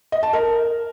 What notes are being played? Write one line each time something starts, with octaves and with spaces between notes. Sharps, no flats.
D#5
A5
A#4